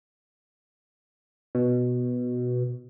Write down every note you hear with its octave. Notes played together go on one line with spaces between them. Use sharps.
B2